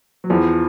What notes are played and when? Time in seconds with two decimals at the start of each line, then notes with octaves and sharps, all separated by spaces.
0.24 F#3
0.30 E2 F3